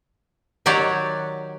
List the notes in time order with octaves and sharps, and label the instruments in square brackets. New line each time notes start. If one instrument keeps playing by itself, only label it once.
[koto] D#3 F#3 G4 C#5 D5 F#5